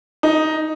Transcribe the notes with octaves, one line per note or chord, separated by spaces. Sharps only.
D#4